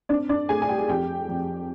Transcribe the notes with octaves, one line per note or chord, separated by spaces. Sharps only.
C4 D4 D5
D4 D5
A3 G#4 G#5
G#5
G4 G5
F2 G4 G5
F2